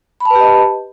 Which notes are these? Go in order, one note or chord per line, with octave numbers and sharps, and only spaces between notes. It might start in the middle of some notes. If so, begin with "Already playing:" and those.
G4 B4 D#5 A5 B5